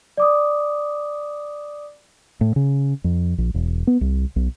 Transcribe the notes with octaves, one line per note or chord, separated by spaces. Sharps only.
D5 D6 D#6
A2
C#3
F2
A#1
E1
B3
C2
B1